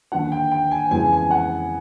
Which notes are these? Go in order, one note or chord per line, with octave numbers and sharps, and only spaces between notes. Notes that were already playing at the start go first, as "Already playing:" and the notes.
D#2 D3 F3 F#5
G5
G5
G#5
F2 C#3 E3 G#3 B3 G#5
G#5
F#5